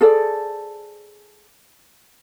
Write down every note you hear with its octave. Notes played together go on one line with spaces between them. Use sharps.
G#4 A4 C5 D5